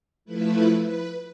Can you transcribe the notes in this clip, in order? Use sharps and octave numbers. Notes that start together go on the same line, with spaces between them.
F3 A3 E4 B4
B4